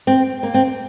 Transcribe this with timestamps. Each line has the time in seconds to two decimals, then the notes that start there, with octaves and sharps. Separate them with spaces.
0.07 C4
0.43 A#3
0.54 C4